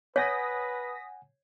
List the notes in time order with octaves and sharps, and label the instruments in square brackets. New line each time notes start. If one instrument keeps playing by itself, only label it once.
[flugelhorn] B4 [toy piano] C#5 [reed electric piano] F#5 G#5 [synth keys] D#6 A#6 B6